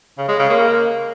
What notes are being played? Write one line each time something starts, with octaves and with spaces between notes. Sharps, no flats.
C#3
G#3
C#3
A#3